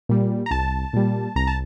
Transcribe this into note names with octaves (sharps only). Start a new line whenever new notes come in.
A#2 G3
A#5
C2 A5
A#2 G3
C2 A#5
A5